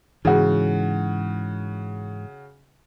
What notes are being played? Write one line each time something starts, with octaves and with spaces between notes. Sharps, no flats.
G#2 C#3 E3 F#4